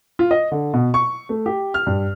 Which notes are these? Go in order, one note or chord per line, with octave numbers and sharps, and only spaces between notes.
F4
D#5
D3
B2
C#6
A3
G4
F6
G2